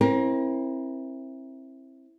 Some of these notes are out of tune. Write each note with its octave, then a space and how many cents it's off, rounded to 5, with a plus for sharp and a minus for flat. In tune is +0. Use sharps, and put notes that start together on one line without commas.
C4 +30 E4 +0 A#4 +25